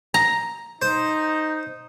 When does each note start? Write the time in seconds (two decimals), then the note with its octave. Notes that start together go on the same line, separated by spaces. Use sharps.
0.14 A#5
0.82 D#4 C5